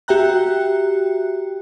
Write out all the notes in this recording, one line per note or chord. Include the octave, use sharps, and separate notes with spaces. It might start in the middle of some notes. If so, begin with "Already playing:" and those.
F#4 G4 E5 G5 A#5 F#6